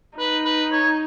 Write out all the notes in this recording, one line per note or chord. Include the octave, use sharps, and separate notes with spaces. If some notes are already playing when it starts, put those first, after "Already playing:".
D#4 B4
B4
C#5